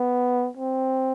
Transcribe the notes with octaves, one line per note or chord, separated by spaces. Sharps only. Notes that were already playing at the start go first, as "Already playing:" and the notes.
Already playing: B3
C4